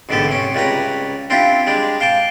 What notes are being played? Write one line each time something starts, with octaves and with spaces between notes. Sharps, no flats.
A1 G#2 D3 B3 G4 A4
C3 C#4
C#2 G3 C#4 B4 A#5
C4 D4 E4 F4 G4
G3 G#3 D4
F5 G5 A5 D6